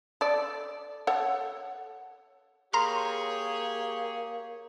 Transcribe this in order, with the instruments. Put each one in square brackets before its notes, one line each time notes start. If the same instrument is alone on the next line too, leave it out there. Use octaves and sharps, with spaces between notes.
[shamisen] A4 D5
A4 C#5 F#5
[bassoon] A#3 [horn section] G4 G#4 C#5 [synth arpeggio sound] A#5 C6 F6